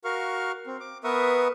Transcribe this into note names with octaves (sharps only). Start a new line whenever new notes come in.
F#4 A#4 F5 C#6 F6
C4
D6
B3 A#4 B4 E5 C#6 D#6